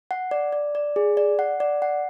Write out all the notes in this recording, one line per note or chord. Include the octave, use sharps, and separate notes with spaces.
F#5
D5
D5
D5
G#4
D5
F#5
D5
F#5